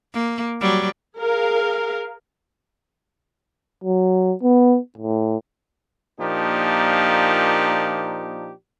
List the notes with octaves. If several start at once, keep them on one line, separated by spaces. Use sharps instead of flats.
A#3
F#3 G3
G#4 A#4 F5
F#3
B3
A2
A#2 F3 A#3 D4 D#4 G4